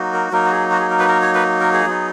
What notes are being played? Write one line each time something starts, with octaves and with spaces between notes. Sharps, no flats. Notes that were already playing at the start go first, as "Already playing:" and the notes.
Already playing: F#3 A#3 D#4 F#4
A#4
F#3 A#3 D#4 A#4
F#4
G#4
F#4
G#4
A#4
B4
A#4
C#5
B4
A#4
G#4
F#3 B3 D#4